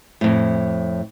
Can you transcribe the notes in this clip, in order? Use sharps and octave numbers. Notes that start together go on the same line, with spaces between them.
F2 A2